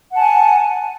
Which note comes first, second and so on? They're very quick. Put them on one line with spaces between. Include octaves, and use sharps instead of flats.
F#5 A5 G#5